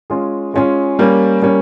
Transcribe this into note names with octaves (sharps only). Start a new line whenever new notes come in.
G#3 C#4 F4 G#4
G#3 C#4 F4 G#4
G3 A#3 C#4
G3 A#3 C#4